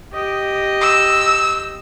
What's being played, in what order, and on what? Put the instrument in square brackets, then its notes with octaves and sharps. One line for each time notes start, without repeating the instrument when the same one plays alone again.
[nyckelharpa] G4 D#5
[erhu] E6